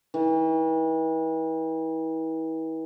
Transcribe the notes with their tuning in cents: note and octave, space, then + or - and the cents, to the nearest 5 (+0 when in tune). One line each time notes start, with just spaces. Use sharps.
E3 -40